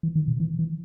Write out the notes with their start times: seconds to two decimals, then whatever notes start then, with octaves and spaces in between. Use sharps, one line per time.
0.03 E3
0.15 D#3
0.28 B2
0.40 E3
0.59 E3